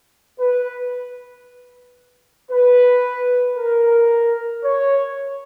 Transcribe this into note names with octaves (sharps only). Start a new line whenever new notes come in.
B4
B4
A#4
C#5